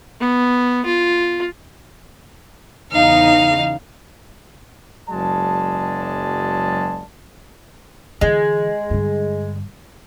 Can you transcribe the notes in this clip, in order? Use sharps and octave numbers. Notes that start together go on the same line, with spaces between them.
B3
F4
E2 C#3 D#4 F5
F#1 F#3 G#3 D5 A5
D3 E3 G#3
G2 D3